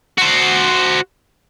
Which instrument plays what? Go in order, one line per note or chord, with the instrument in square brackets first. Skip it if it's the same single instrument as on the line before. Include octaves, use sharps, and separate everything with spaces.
[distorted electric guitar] F#4 C5